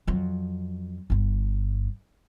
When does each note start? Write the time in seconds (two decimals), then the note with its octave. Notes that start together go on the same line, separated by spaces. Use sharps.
0.07 F2 F#3
1.10 G1 G2